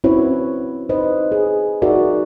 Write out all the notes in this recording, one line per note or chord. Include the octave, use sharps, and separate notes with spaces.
C4 C#4 E4 F#4 B4 C#5
D#4 B4 C5 D#5
G#4
D#4 F#4 G#4 A#4 D5 E5